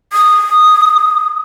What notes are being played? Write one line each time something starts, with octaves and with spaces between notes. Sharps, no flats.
D#6